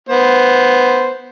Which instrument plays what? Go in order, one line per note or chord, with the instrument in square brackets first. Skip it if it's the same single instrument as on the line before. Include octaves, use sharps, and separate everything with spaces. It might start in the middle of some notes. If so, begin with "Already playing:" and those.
[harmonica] B3 C5